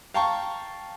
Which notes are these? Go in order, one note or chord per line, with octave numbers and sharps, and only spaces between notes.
F5 G5 A5 A#5 C#6